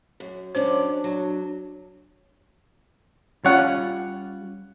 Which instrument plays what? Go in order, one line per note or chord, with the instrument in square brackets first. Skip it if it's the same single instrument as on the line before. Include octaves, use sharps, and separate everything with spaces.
[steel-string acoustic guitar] F#2
[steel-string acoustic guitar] F#2 C#4 D5 [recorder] D4 [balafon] C5
[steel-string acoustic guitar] F#3
[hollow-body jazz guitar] G3 C#4 F4 [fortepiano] C#5 F#5